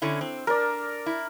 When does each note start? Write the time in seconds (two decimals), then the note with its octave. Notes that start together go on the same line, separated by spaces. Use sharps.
0.02 D3 C#4 E4
0.21 C4
0.47 D4 A#4 D5
1.06 E4